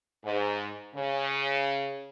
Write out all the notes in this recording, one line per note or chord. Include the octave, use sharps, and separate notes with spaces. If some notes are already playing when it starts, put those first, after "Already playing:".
G#2
C#3